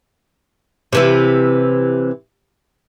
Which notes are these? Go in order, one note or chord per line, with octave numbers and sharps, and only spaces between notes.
C3 E3 E4